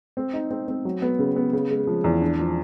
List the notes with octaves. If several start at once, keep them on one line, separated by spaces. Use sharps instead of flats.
C4
D#4
C4
C4
F#3
B3
C#3
B3
C#3
G#3
F3
E2
D4
F3